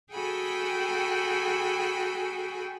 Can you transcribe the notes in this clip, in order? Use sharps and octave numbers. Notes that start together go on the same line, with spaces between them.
F#4 G#4 A4 G5 G#5 B5